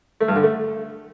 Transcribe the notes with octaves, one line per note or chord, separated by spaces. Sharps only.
A3
G2
D3
A3